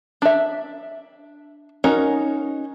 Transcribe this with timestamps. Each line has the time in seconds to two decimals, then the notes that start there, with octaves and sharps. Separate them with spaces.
0.22 D4 E5
1.84 C#4 D#4 F#4 A#4